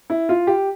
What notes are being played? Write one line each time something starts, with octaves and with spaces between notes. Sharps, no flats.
E4
F4
G4